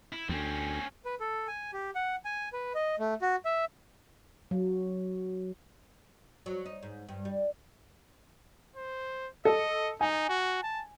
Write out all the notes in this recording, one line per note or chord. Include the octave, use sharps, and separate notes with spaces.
E4
D2 C4 C#4
B4
A4
G#5
G4
F#5
G#5
B4
D#5
A3
F#4
E5
F#3
F#3
D#4
G#2
G2
G3
C5
A4 D#5
D#4 G#5
F#4
A5